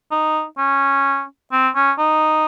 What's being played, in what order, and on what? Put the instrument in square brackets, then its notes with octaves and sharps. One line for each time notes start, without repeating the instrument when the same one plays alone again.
[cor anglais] D#4
C#4
C4
C#4
D#4